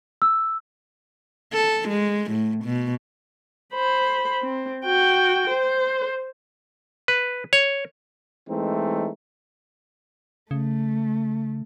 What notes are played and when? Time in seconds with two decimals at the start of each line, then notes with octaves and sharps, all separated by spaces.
0.22 E6
1.53 A4
1.89 G#3
2.31 A2
2.64 B2
3.74 C5 B5
4.43 C4
4.85 F#4 G5
5.50 C5
7.08 B4
7.53 C#5
8.48 E3 G#3 A3 C4 D#4
10.51 C#3 A3